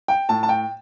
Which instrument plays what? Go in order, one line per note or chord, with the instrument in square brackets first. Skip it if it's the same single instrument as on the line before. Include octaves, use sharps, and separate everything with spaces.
[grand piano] G5
A2 A5
A5
G5